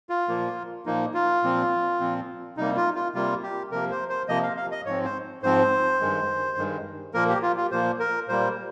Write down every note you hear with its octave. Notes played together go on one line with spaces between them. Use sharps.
F4
A#2 F3 A#3
A#2 F3 A#3 D#4
F4
A#2 F3 C4
A#2 F3 C4
C3 G3 A#3 D#4
F4
F4
C3 G3 A#3 F4
G4
C3 F3 A#3 A#4
C5
C5
C3 F3 A#3 D#5
F5
F5
D#5
G#2 F3 C4 C#5
C5
G#2 F3 C4 C5
G2 D#3 G#3
G2 D#3 G#3
A#2 F3 A#3 A#4
G4
F4
F4
A#2 F3 A#3 C5
A#4
A#2 G3 A#3 C5